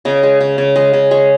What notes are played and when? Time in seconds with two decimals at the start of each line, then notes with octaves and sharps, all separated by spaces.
0.05 C#3 D#5
0.23 G#3
0.41 C#3
0.58 C#3
0.76 G#3 D#5
0.93 C#3
1.11 G#3 C#5